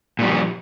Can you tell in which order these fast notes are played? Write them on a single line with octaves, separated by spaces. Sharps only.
A#2 G3 F3